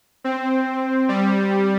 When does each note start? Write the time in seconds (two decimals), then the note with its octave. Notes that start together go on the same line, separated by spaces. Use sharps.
0.24 C4
1.09 G3